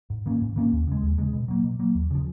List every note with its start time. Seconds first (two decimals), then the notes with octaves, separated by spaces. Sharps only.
0.10 G#2
0.26 D#3 A#3 C#4
0.41 G#2
0.56 D#3 A#3 C#4
0.72 D#2
0.87 C#3 G#3
1.03 D#2
1.18 C#3 G#3
1.33 B2
1.48 F#3 A#3
1.64 B2
1.79 F#3 A#3
1.95 D#2
2.11 C#3 F3